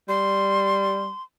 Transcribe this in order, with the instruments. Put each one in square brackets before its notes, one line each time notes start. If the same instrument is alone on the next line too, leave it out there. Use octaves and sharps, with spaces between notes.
[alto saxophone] G3 [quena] C6